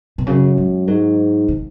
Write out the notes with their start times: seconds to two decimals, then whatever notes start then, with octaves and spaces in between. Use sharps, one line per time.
0.18 B2
0.27 F#2 C#3
0.57 G#3
0.88 G#2 F#3
1.48 D#3